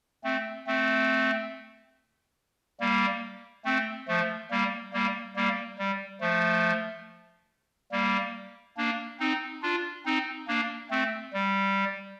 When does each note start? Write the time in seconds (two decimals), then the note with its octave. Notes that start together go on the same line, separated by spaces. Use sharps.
0.24 A3 C4
0.67 A3 C4
2.80 G3 A#3
3.65 A3 C4
4.08 F3 A3
4.51 G3 A#3
4.93 G3 A#3
5.36 G3 A#3
5.78 G3
6.21 F3 A3
7.92 G3 A#3
8.77 A#3 D4
9.20 C4 D#4
9.62 D4 F4
10.05 C4 D#4
10.48 A#3 D4
10.91 A3 C4
11.33 G3